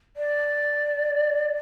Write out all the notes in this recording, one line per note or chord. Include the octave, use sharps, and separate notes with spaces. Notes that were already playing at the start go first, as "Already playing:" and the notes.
D5